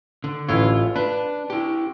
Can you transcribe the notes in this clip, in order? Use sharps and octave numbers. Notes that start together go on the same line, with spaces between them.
D3
A1 E4 F4 C#5
D4 B4
E4 G4